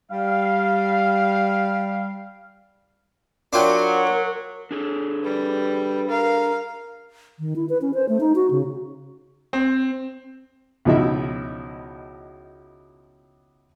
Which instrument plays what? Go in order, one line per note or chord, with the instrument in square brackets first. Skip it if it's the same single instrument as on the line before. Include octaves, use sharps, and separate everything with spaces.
[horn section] G3 F5
[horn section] F#3 [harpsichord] D4 F4 G5 [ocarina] A#4
[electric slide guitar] D4 G#4 A4
[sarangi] G3 [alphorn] B4
[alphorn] A#4 [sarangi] F5
[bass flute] D#3
E4
B4
C#4
C5
A3
D#4
F#4
C#3
[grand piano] C4
[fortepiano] C#2 B2 F3 D#4 E4 E5